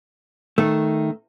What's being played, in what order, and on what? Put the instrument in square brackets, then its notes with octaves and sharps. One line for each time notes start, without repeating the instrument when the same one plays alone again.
[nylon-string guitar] D#3 [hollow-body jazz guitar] A3